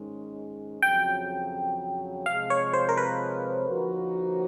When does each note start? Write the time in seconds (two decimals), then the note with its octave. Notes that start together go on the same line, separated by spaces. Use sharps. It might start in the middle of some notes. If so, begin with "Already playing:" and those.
Already playing: G#2 D#3 G#3 C#4
0.82 F2 C#3 F#3 G5
2.26 C3 F3 G#3 F5
2.50 C#5
2.73 C5
2.89 A#4
2.97 B4
3.69 D3 F3 A#3 D#4 F#4